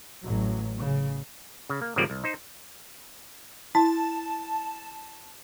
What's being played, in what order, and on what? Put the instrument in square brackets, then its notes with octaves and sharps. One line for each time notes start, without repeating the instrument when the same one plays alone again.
[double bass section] A1 F#3
C#3
[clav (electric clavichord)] C#3
A#3
G#1 C#3 F3 G3 A#3 D5
C2
D#4 C5
[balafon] E4 [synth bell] A5